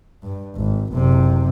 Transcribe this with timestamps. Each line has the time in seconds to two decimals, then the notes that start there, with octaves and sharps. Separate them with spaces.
0.23 G2
0.55 G#1
0.94 F#1 C3